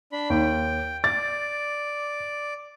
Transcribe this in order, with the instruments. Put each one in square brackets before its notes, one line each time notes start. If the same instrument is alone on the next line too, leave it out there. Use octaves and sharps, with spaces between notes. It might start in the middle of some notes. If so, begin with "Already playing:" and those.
[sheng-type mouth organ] D4 B5
[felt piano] D#2 [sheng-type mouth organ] G5
[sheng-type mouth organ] D5 [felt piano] A6